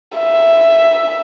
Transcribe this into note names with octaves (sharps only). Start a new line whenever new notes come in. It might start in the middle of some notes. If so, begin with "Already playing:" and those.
E5